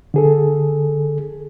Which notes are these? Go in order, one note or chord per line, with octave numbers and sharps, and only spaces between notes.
D3 G#4 A4